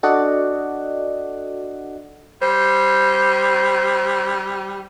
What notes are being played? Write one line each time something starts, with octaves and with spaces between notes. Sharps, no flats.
D4 F#4 A4 D5 D#5 F#5
G3 C5